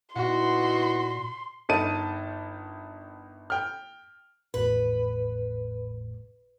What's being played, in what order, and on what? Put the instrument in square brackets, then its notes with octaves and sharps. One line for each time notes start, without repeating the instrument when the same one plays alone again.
[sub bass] A#2 [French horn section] B3 D#4 E4 [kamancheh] F#4 [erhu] C6
[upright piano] G1 D#4 A#4 A5 D#7
G5 F6
[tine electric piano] G#1 E2 A2 [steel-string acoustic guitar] B4